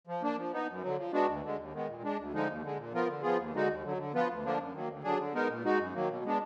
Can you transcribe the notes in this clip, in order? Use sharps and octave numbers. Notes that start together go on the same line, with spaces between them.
F3
A#3 D4
F3
B3 D#4
F#2
D3 F#3
F3
G#3 B3 D4 F#4
D2
D3 G#3
D#2
D#3 G#3 B3
A#2
G#3 D4
D2
D3 F3 G#3 D#4
D#2
D3 G#3
A#2
F3 B3 F4 A#4
D3
F3 B3 F4 G#4
D#2
D3 G#3 D#4 F#4
D#2
D3 F#3
D3
F3 B3 F4 B4
D2
D3 F3 A#3 D4
F#2
D#3 F#3 A#3
D2
D3 F#3 D4 G#4
D3
G#3 B3 D#4 A#4
A#2
G#3 D#4 F#4
F#2
D#3 F#3 A#3
B2
G#3 B3 D4